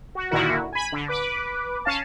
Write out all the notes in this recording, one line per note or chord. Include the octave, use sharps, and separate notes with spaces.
F#4
A#2 D3 D#3 E4 F#4 A#4
G#5 B5
D3
B4 D6
C#4 F5 A5